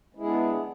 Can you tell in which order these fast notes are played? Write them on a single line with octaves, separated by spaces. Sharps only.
G#3 E4 G#4 B3 D4